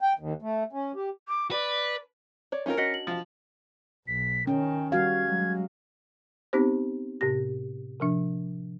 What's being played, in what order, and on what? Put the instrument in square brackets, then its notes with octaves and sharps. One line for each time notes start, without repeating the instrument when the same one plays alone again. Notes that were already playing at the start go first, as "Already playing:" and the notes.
[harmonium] G5
D#2
A3
C#4
G4
[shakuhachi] D6
[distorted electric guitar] B4 [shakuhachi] D5
[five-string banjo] C#5 D5
[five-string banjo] C4 D#4 F4 [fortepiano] C#4 A#4
[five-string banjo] D4 F#4 D#5 [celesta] A#6 B6 C#7
[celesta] F#7
[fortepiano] F3 F5
[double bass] B1 [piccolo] B6
[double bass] D#3 [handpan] C#4 [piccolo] G5
[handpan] G3 F#4 F5 [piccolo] G#6
[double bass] F#3 G#3
[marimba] B3 C4 D#4 G4 C5
A2 C3 G4 A#6
C3 F3 D4